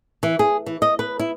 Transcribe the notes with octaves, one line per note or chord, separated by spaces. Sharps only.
E3
G#4
E3
D#5
B4
E4